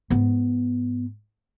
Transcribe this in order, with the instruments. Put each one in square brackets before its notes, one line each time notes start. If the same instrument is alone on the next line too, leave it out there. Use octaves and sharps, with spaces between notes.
[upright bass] G#2 B3